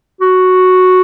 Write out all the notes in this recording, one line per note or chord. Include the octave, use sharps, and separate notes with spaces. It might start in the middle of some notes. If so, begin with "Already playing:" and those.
F#4